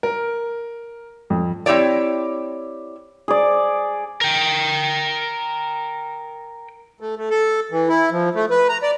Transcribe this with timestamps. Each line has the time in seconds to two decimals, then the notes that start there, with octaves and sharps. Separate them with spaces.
0.03 A#4
1.30 F2
1.66 C4 E4 G4 C#5 D5
3.28 G#4 D5
4.21 A#4 G5
7.00 A3
7.17 A3
7.30 A4
7.71 E3
7.89 E4
8.12 F3
8.35 A3
8.50 B4
8.69 A#5
8.83 D5